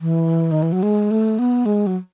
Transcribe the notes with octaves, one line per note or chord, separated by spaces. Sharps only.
E3
D#3
E3
F#3
G#3
A3
B3
G#3
F#3